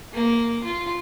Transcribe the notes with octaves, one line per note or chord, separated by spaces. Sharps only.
A#3
F4